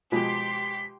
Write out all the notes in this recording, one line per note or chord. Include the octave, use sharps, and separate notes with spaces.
B2 F3 G#3 G4 C6 B6